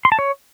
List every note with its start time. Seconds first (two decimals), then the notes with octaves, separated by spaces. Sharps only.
0.05 C6
0.12 A5
0.19 C#5